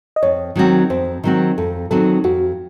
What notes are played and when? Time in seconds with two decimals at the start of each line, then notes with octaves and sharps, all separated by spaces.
0.16 D#5
0.23 F2 C#5
0.56 D#3 F#3 C4 F#4
0.90 F2 C5
1.24 D#3 F#3 C4 F#4
1.58 F2 A4
1.91 D#3 F#3 C4 F#4 A4
2.24 F2 F#4